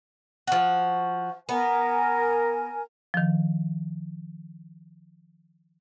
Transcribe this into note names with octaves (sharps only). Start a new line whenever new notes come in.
F3 F#4
B3 A#4 G#5
D#3 F3